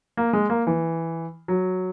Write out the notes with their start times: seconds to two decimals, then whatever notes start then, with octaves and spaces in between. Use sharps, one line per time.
0.17 A#3
0.33 G#3
0.50 A#3
0.67 E3
1.48 F#3